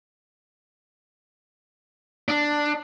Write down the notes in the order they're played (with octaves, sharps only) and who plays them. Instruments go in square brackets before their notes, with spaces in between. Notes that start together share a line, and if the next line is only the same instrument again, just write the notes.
[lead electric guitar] D4